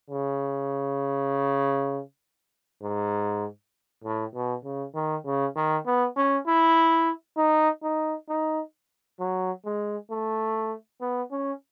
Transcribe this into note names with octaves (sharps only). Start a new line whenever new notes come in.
C#3
G#2
A2
B2
C#3
D#3
C#3
D#3
B3
C#4
E4
D#4
D#4
D#4
F#3
G#3
A3
B3
C#4